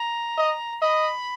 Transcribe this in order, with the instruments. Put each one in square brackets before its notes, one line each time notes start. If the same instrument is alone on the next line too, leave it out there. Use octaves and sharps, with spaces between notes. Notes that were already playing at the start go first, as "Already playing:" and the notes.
Already playing: [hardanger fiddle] A#5
[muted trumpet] D#5
[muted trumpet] D#5 [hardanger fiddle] B5